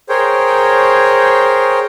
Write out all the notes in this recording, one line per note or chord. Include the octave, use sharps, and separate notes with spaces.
G#4 A#4 C5 C#5 G5